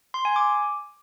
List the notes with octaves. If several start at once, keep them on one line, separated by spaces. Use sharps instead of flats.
C6
G#5
D6